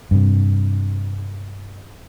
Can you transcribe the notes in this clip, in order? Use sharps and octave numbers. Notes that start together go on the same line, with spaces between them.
G2 C3